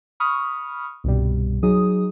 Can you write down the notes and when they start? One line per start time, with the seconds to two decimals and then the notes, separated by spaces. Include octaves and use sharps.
0.20 B5 C#6 D#6 F6
1.04 C2 G2 B2 G3
1.63 F#3 D#4 G#4 D#6